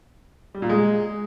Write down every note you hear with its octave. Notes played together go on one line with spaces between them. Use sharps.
G3
A#2
G#3